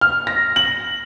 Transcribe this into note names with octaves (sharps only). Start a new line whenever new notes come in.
F6
A#6
F#7